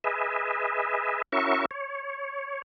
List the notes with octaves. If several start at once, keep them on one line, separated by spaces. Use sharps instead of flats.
G#4 B4 D#5 E5
C#4 E4 F#4 A#4 E5 C#6
C#5